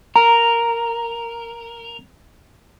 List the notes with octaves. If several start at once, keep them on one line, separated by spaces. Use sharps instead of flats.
A#4 A#5